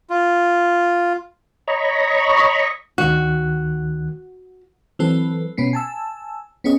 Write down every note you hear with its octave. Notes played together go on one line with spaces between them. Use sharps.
F4
C#5 D#5 A#5 B5 C#6
D2 D#3 F#4 F#6
E3 F#3 C4 A4 B4
B2 B3 C#4 C7
G#5 A5 E6
B3 C#4 G#4 D#5